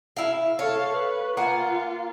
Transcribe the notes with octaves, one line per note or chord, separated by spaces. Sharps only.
E4 F5
A4 C#5 F5
B4
A#3 F4 F#5 G#5